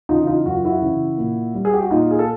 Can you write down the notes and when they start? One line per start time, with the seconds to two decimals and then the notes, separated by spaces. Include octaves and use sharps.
0.09 C#3 E3 D#4 F4
0.27 D#4 F4
0.45 F#2 F#4
0.55 F4
0.65 E4 F#4
0.81 C#3 E3
1.17 A#2
1.54 G3
1.65 G#4
1.74 G4
1.82 F#4
1.90 A#2 D#4 F4
2.11 G#4
2.19 A4